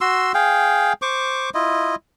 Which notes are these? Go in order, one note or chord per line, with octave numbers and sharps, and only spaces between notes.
F#4 C6 E6
G#4 F5 G5
C5 C#6 D6
E4 F4 D#5